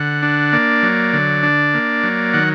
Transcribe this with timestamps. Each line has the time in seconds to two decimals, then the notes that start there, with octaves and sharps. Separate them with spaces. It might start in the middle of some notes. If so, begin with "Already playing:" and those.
Already playing: D3 F#5
0.23 D4
0.52 A#3 D5
0.83 F#3
1.13 D3
1.43 D4
1.74 A#3
2.04 F#3
2.33 D#3 F#5